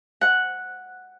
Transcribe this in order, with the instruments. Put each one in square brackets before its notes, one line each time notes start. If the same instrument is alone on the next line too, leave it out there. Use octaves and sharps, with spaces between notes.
[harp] F#5